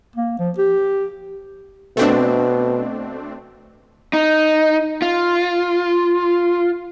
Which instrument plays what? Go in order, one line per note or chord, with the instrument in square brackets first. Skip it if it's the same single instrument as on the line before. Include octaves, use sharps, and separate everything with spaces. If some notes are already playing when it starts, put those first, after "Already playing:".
[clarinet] A#3
F3
G4
[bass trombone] B2 [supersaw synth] A3 C4 D4
[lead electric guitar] D#4
F4